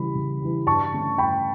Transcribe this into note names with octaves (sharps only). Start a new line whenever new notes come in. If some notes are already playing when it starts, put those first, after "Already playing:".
Already playing: C#3 E3 G3 B5
C#3
E3 G3
G2 A5 C#6
D3 A3 C#4
G2 G5 B5